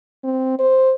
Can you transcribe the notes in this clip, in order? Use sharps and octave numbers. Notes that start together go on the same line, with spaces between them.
C4
C5